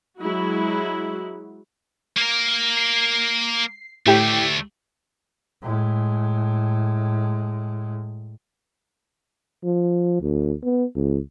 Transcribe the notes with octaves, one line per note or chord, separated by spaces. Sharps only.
F#3 G#3 E4 F#4
A#3 A#4
C7
D2 A2 A3 G4
A2 G#3
F3
D2
B3
C#2